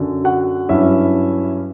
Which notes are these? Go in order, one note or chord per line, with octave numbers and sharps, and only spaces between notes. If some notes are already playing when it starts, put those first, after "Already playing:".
Already playing: F#2 D3 F#3
F#4 F#5
G2 F#3 C#4 E4 E5